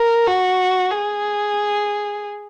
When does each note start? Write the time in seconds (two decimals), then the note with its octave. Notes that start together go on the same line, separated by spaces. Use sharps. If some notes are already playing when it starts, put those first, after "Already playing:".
Already playing: A#4
0.27 F#4
0.91 G#4